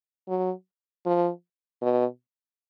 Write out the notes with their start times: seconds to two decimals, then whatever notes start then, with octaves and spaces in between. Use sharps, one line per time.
0.28 F#3
1.06 F3
1.82 B2